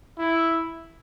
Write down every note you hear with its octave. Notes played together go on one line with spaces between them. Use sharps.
E4